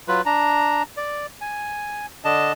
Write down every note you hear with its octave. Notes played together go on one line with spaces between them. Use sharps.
F#3 F4 B4
D4 A#5
D5
G#5
D3 D4 D#5 A5